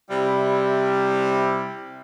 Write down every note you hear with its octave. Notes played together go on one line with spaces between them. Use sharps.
C3 G3 E4